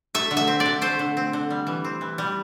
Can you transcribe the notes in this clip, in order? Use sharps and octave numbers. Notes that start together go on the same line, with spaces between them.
A3 E5
D3
E5
C4
D5
D3
A3 C5
D3
C4
D3
G3
E3
C4
E3
G3